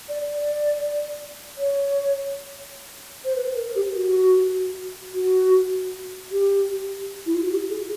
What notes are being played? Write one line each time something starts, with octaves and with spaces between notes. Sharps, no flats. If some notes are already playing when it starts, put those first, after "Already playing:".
D5
D5
C#5
C5
B4
A#4
G4
F#4
F#4
G4
E4
F4
F#4
G4
G#4